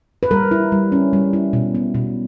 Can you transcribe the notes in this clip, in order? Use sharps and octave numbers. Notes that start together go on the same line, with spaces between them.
B4
G3 A#4
E4
G3
C#4
G3
E4
B2
B3
B2